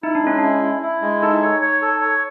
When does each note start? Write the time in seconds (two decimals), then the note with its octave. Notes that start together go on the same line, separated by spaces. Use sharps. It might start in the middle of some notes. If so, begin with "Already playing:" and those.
0.03 D#4 E4
0.15 D4
0.23 G#3 C#4
0.39 D4 E4
0.63 E4
0.82 E4
1.02 G#3
1.22 D#4 A4
1.42 C#5
1.62 C#5
1.82 A4
2.01 C#5